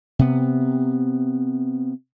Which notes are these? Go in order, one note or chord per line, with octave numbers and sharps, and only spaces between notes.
C3 B3